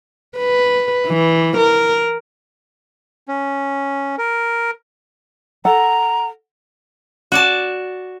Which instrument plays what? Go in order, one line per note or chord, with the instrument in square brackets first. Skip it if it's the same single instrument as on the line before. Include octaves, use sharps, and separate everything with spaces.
[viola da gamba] B4
E3
A#4
[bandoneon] C#4
A#4
[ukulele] A4 F#5 [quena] A#5
[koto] F#4 D5 A5